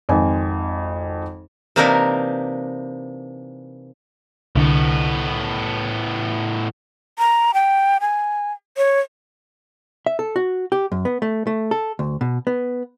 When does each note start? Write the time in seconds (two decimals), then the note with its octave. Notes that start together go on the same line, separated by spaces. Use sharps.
0.09 G#1 F2 G#5
1.76 C3 E3 A#3 D4 D#4 A#4
4.55 C2 A2 D3 B3
7.19 A#5
7.54 G5
8.01 G#5
8.77 C#5
10.06 E5
10.19 A4
10.36 F#4
10.72 G4
10.92 F#2
11.05 B3
11.22 A3
11.47 A3
11.71 A4
11.99 D2
12.21 B2
12.47 B3